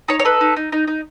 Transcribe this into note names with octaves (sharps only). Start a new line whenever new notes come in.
D#4 C#5
C#5
A4 B4
D#4
D#4
D#4
D#4